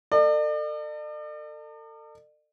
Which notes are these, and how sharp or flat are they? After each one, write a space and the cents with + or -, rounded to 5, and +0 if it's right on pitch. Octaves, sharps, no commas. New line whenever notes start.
A4 +35 D5 +45